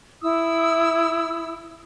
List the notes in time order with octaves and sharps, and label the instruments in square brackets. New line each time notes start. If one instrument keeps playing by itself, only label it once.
[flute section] E4 D#6 E6